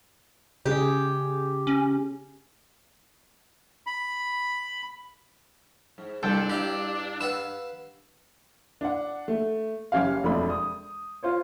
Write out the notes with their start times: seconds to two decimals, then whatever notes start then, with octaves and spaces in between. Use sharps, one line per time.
0.66 C#3 G4 G#4
1.67 C#4
3.87 B5
5.98 G#2
6.23 C2 G2 D4 A4 G5
6.49 E4 G4 F5
7.21 B4 F5 F#5 E6
8.81 D4 F#5
9.28 A3
9.92 F#1 C#4 G4 F5
10.23 E1 F2 A3 D4 B5
10.50 D#6
11.23 F4 C5 C#5